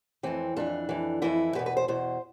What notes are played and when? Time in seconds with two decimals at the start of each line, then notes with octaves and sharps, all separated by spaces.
0.23 F2 E3 C4
0.56 F2 E3 D4
0.89 F2 E3
1.22 F2 E3 E4
1.55 E2 B4
1.59 B2
1.66 B4
1.77 C5
1.88 E2 B2 C5